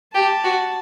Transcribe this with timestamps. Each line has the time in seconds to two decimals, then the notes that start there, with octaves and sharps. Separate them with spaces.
0.15 G4 A5
0.44 F#4